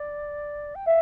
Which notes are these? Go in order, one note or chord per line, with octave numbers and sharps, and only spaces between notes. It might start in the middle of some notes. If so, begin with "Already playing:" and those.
Already playing: D5
G5
E5 F5